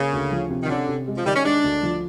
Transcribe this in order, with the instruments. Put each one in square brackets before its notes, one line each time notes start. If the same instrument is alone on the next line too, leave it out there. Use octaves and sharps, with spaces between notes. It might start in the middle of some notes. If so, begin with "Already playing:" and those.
Already playing: [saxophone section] C#3 [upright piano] A#3
[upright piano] D2
F3
C3
[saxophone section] D#3
[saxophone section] D3 [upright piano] C#4
[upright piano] C3
G#3
[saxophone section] F3
[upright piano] D#3 [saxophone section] G3
[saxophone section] C#4
[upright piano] G#3 [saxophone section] D4
[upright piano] D2
F3